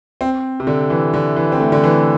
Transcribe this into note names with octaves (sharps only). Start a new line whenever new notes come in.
C4
C3
D3
E3
D3
E3
C4
A3
D3
E3